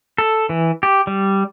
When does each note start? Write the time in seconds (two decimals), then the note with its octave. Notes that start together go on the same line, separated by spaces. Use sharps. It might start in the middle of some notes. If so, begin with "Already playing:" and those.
0.18 A4
0.49 E3
0.83 G4
1.07 G3